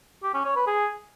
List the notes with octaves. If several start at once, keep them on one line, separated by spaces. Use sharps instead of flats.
G4
C#4
C#5
B4
G#4